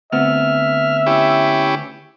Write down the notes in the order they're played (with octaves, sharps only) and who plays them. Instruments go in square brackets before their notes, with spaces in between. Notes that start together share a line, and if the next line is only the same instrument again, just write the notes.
[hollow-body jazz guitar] D2 B3 C4 [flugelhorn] E5 [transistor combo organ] F6
[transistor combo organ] C#4 E4 G4